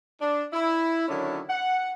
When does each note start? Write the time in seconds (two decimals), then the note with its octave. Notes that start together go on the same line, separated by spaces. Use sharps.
0.22 D4
0.53 E4
1.09 D3 D#3 F#3 C#4 D4 E4
1.49 F#5